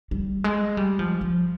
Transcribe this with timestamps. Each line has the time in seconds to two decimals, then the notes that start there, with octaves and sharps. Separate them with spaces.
0.11 G3
0.44 G#3
0.77 G3
0.99 F3
1.21 F3